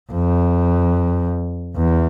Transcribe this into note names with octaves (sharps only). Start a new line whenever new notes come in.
F2
E2